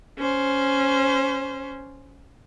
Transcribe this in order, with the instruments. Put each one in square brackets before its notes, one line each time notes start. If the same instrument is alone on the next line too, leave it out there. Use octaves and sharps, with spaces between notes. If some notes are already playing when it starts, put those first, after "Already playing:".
[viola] C#4 C5